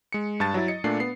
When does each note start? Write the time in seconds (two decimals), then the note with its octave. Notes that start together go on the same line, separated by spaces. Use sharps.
0.13 G#3 C#7
0.40 G2 A5 A6
0.54 F#3 E4
0.68 D#5 C#7
0.84 A#2 A3 D4 C7
1.00 B3 C7